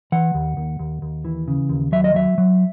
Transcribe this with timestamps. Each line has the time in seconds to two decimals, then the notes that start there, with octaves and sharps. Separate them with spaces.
0.12 E3 F#5
0.35 D#2
0.57 D#2
0.79 D#2
1.02 D#2
1.25 E3
1.48 C#3
1.69 D#2
1.92 F#3 E5
2.04 D#5
2.14 F#3 E5
2.38 F#3